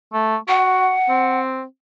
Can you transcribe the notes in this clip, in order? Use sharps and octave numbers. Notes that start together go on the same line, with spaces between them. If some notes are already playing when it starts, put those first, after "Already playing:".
A3
F#4 F#5
C4